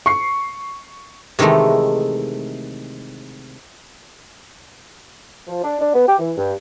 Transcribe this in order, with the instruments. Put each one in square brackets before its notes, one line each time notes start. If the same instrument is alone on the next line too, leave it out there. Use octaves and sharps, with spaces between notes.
[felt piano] C#6 C7
[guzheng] C3 D#3 E3 G#3 A3
[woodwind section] F3
D4
D4
B3
G4
E3
G2